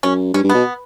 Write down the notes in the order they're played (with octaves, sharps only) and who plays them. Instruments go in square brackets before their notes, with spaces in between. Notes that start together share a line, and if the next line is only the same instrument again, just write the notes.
[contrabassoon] F#2 [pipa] C#4
[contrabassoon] G2 [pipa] C#4
[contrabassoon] G2
[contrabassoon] B2 [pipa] B3